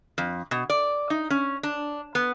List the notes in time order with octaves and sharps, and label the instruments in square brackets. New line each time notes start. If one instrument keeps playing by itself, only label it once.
[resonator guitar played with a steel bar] F2
B2
D5
D#4
C#4
D4
B3